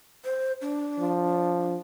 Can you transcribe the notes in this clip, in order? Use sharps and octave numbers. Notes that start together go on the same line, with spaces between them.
C5
D4
F3